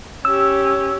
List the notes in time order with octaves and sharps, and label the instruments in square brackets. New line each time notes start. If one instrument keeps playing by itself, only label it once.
[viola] C#4 G4 [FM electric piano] E6